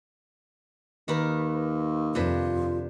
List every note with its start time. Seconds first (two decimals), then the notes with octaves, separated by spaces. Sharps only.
1.08 D#2 D#3 A#4 B4
2.15 F2 C3 D4 F4 B4